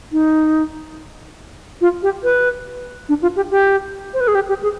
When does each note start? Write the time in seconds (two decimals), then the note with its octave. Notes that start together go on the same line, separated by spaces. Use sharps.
0.12 D#4
1.81 F4
2.03 G4
2.24 B4
3.09 D4
3.22 F4
3.36 G4
3.51 G4
4.14 C5
4.20 B4
4.28 G#4
4.35 G4
4.49 G4
4.63 G#4